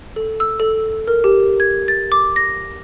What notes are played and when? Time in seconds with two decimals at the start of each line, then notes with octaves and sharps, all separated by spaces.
0.16 A4
0.40 E6
0.60 A4
1.08 A#4
1.24 G4
1.60 G#6
1.88 A6
2.12 D6
2.36 A#6